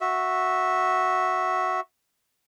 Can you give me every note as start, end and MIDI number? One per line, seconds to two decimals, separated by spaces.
0.01 1.80 66
0.01 1.80 76